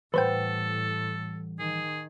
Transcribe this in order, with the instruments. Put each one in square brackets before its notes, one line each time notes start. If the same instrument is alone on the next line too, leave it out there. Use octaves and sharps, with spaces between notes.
[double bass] A2 [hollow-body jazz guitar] E3 G3 F#5 [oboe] A4 [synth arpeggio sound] B4 C5 G5
[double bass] D#3 [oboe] G#4